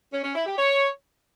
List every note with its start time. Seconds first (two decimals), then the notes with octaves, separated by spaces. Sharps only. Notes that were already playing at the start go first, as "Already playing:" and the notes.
0.12 C#4
0.23 C#4
0.34 E4
0.46 G4
0.57 C#5